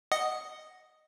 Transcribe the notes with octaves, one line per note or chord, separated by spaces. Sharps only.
D#5 F#5 D#6